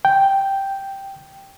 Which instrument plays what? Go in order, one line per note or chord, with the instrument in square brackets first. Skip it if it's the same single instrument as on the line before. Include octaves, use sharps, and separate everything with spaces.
[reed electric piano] G5